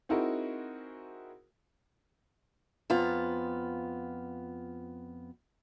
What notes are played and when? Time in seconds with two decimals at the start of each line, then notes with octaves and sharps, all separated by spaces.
0.09 C4 D#4 E4 F#4 G#4 A#4
2.90 F2 B3 F4 A#5